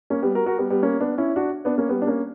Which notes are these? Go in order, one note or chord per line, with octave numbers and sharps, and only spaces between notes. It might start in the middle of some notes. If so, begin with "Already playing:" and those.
A#3 C#4
G3 B3
F#4 A#4
F#4 A#4
G3 B3
G3 B3
A#3 C#4
B3 D4
C#4 E4
D4 F#4
B3 D4
A#3 C#4
G3 B3
D4
A#3 C#4